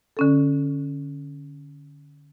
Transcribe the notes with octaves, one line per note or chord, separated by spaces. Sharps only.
D3 C#4 A4